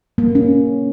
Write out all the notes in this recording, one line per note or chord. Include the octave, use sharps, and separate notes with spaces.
A#3
C#4